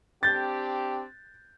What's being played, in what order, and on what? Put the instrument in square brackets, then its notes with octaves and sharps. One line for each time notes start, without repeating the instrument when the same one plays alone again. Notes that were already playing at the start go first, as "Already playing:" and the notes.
[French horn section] C4 D4 G4 [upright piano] G6 A6